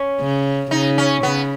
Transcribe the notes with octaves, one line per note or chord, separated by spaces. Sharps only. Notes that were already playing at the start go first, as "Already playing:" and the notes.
Already playing: C#4
C#3
C#3 D#4
C#4
C#3 B3